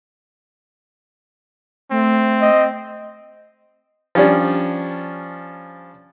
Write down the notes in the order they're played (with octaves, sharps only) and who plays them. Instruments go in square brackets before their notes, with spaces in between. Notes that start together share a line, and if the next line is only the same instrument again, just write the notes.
[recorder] A3 [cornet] C4
[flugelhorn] D#5
[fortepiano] F3 G3 C#4 D4